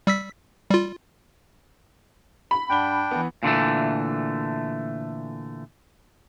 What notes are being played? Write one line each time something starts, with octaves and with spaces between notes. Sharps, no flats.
G3 E6 B6
G3 F4
B5
G2 D4 F#5 G5 G7
E3 B3
A#2 D3 E3 A3